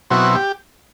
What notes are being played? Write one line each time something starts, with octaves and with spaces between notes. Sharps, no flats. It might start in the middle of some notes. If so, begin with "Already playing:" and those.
B2 F#3 C4 E4 F#4
G4